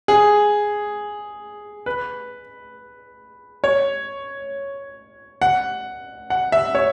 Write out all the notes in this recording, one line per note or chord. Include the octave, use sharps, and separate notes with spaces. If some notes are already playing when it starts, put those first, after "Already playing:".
G#4
B4
C#5
F#5
F#5
E5
C#5